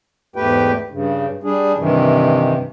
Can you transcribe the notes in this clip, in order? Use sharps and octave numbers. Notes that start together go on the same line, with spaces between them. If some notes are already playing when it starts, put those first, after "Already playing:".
E2 G#2 A3 G4 B4 G5
G2 C#3
G3 D4 G#4
G2 C3 D#3 E3